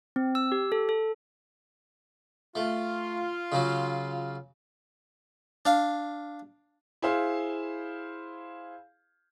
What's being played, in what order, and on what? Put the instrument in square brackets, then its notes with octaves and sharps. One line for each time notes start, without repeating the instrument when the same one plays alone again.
[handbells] C4
E6
G4
A4
A4
[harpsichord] A3 [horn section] F4
[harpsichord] C#3 F#3
D4 F5
[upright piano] E4 G#4 C5 F5